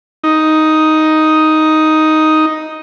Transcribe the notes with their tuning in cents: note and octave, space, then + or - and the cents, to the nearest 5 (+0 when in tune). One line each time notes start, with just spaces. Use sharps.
D#4 +5